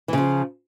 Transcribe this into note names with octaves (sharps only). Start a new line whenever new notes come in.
C#3 E3 F3